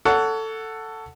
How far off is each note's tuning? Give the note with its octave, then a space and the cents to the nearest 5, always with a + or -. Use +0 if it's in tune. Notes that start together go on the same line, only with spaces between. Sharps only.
A4 +10 C#5 +30 F#5 +0